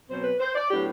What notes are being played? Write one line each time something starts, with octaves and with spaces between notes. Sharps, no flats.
B2 F#3 C4 C5
B4
C5
D5
A2 F#3 B3 D4 G4